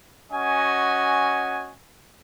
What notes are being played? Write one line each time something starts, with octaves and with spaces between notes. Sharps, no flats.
C#4 F#4 D#5 F#5 G#5